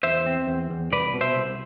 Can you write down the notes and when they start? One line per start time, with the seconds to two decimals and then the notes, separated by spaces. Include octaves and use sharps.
0.03 E2 C5 E5
0.26 C4
0.47 E2
0.70 E2
0.92 C2 B4 D5
1.13 B2
1.21 C5 E5
1.36 C2